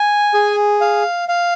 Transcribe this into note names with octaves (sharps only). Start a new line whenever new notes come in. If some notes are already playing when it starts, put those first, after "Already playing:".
Already playing: G#5
G#4
F5
F5